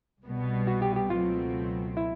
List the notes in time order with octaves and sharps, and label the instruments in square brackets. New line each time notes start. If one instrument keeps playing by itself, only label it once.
[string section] C2 B2 G3 B3
[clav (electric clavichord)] F#4
G4
G4
[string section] C#2 B2 F#3 A3 C4 [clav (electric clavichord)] F4
[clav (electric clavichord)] E4